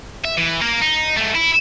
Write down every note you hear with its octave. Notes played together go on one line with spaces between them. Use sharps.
E5
E3
A#3 A#4
D#4
G#2 A3
E4